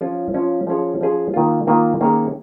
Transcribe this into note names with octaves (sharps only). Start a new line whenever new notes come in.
F3 C#4 F4 C#5
F3 C#4 F4 C#5
F3 C#4 G#4 C#5
F3 C#4 G#4 C#5
D#3 A#3 F4
D#3 A#3 F4
D#3 A#3 C#4 G#4 C#5